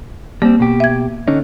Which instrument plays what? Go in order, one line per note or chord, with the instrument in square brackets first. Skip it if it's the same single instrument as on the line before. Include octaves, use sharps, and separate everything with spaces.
[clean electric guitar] G3 C4 [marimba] A#3
[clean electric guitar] B2 G4
[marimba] E5 G#6
[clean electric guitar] D3 C#4 D#4